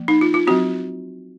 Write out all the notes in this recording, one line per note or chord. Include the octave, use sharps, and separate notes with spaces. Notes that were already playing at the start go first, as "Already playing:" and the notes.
Already playing: F3 A#3
D#4
F4
F4
F#3 C4 F#4